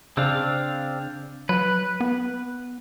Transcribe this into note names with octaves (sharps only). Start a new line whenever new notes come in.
C#3 C4 D4 F5
F#3 B4
B3